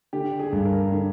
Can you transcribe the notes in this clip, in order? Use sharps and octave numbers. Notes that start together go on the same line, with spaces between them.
D3 G4
G#4
G2
A#4
D3